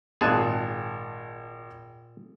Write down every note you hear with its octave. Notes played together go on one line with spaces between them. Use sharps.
G#1 A#2 G#4 A5 F#6